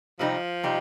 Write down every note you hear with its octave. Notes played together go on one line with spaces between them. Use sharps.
C3 F3 G3 C4 D#4 G4
C3 G3 C4 D#4 G4